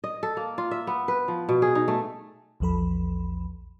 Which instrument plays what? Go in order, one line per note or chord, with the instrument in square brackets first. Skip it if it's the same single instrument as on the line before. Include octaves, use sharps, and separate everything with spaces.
[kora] D#5
A4
A#3
F4
E5
B3
B4
F3
B2
G#4
D#4
A3
[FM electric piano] A#1 E2 F3 A4 B5